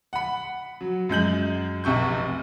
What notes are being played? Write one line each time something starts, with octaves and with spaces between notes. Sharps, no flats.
F#5 B5
F#3
F#2 G#3 G6 F#7
F1 B1 C3 C#6 G6